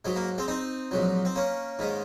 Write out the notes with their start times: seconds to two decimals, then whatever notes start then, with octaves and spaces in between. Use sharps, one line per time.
0.05 G#2 F#3 G#3
0.16 A#3
0.38 G#3 C4
0.48 C4 D#4
0.91 A#1 G#2 F#3
1.25 C4
1.36 A#3 C#4
1.79 G#2 D#3 G#3